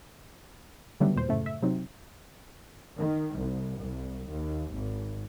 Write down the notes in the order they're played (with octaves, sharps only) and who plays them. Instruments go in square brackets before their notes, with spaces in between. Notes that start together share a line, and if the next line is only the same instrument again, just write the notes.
[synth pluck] D3 D#3 F#3 G3 A3 B3
D#2 A#2 C5
F#2 A2 C#3 A3
E5
C3 F#3 C4 D#4
[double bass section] D#3
C2
C2
D#2
G#1